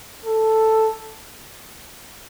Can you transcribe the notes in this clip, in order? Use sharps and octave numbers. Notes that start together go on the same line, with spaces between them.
A4